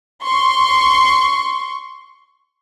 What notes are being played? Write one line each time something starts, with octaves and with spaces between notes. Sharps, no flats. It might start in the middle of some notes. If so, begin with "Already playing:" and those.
C6 C#6